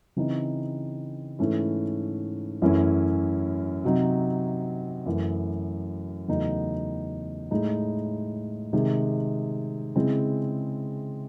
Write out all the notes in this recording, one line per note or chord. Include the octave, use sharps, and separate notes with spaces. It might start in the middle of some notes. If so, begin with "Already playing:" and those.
C#3 E3 C4 D#4
G#2 E3 A3 C#4 E4
F#2 E3 A3 C#4 E4
C3 F#3 C4 D#4
F#2 E3 A3
E2 C#3 F#3 A3 D#4
A2 G#3 D#4
C3 D#3 G#3
C#3 G#3 C4 E4